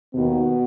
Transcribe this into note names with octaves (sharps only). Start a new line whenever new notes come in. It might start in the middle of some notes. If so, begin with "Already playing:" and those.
D#2 B2 D#3 B3